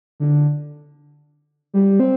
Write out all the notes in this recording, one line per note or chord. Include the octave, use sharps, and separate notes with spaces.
D3
G3
C4